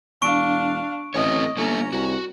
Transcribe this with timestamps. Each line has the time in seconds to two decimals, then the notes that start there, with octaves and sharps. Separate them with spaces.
0.22 E1 D4 F5 C#6 D7
1.14 A1 A3 C4 C#5 D#5
1.57 G1 A#3 C#4 A4 A#5
1.93 C2 F#4